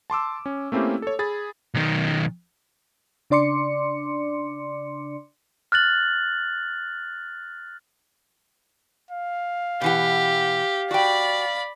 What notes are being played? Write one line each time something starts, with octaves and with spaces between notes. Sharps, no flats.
A5 C6 D6 E6
C#4
A3 A#3 C4 C#4 E4 G4
A4 C#5
G#4 B5 A6
B1 D#3
C#3 D4 D5 C6 D6 C#7
F6 F#6 A6 F#7
F5
B2 E3 G4 F#5
F#4 D5 G5 B5